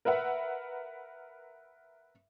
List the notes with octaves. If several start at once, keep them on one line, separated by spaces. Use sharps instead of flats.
A#4 B4 E5 F#5